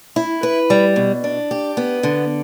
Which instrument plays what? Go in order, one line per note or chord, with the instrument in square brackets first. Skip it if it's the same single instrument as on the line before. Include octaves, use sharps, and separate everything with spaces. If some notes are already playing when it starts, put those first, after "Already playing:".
[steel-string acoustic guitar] E4
B4
G3
B2
D4
G4
B3
D3